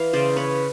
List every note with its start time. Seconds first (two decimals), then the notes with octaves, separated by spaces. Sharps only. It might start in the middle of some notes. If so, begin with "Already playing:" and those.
Already playing: E3 F5
0.13 C#3 C5 D5
0.36 B4 C#5